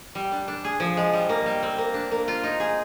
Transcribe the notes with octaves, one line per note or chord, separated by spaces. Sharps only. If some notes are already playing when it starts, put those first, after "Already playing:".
G3
D4
D4
G#4
F3
G#3
G3
A#3
G3
C4
A#3
D4
A#3
F4
D#4
G#4